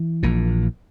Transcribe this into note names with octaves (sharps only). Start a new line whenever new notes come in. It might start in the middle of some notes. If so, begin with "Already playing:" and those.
Already playing: E3
A#1 A#2